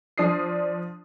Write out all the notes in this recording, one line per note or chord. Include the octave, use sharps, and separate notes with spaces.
F3 D4 D#6 C7